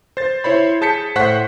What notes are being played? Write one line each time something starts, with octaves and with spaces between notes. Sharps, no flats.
C5 A6
E4 C5 C#5 B5
G#4 A5 G6 B6 C#7
A2 C5 F#5 C#6 F#6 B6